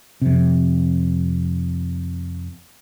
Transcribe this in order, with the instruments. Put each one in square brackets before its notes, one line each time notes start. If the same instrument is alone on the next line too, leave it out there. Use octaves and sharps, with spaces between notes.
[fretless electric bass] F2 C3